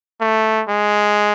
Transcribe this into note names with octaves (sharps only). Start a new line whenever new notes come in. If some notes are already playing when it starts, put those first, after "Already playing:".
A3
G#3